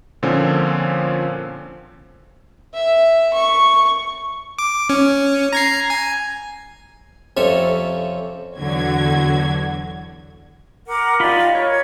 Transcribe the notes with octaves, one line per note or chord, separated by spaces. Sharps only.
A#2 D3 F3 C4 C#4
E5
C#6
D6
C#4
A#5 G#6 C7
G#5
F2 C3 C#4 A4 C#5 E5
E2 D3 F#3 F#4 G#6
A#4 F#5 D6
D#4 F4 G4 D5 B5
A#4 C#5
G#6